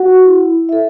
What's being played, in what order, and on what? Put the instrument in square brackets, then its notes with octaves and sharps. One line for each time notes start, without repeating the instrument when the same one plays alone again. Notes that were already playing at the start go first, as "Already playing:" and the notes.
Already playing: [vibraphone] F#4 F#5
E4
A4 E5